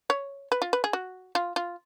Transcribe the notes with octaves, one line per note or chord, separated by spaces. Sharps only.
C#5
B4
F4
B4
G#4
F#4
F4
F4